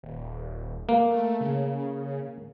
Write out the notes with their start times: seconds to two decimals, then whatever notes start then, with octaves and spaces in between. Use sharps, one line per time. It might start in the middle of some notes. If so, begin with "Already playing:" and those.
0.03 D#1
0.89 A#3
1.10 A3
1.40 C#3